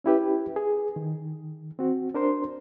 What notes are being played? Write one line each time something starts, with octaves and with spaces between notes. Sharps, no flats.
C#4 E4 G4 B4
G#4
D#3
C4 F#4
D4 A#4 C5 C6